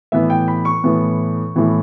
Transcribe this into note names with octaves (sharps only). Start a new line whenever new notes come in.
A2 E3 B3 E5
G5
B5
C#6
A2 E3 B3
A2 E3 B3